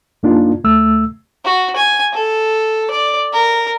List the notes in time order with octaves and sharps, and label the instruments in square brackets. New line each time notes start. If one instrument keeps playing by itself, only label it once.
[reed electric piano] F#2 A#3 D4 D#4 F4
D2 A3 E6
[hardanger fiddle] F#4
G#5
A4
D5
A#4